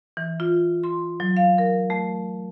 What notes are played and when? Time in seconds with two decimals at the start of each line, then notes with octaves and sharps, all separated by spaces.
0.17 E3
0.40 F4
0.84 C6
1.20 F#3
1.37 F5
1.58 A#4
1.90 A3